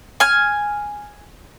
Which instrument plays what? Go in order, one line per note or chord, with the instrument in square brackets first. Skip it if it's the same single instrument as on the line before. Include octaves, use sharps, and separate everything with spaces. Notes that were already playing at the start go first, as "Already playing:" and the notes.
[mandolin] G#5 F6